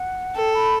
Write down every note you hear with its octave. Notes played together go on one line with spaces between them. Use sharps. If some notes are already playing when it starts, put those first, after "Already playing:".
Already playing: F#5
A4 G5
B5